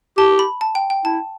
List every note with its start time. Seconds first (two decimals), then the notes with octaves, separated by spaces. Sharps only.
0.18 G4 A5
0.39 B5
0.61 A5
0.75 G5
0.90 G5
1.05 E4 A5